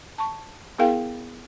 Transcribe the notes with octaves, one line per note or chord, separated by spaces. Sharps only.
A5 C#6
B3 E4 G#4 A#4 F5 G5